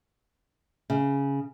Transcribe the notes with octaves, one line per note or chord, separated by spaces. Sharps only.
C#3